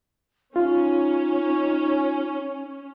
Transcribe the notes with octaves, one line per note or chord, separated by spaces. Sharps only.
C#4 D#4 F4